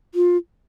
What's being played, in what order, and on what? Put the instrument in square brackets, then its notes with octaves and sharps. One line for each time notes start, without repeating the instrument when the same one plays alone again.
[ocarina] F4